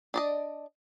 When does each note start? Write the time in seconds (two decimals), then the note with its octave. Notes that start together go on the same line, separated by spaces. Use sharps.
0.14 D4 D5 D#5